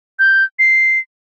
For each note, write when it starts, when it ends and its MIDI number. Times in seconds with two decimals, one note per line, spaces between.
0.19 0.44 91
0.59 0.99 96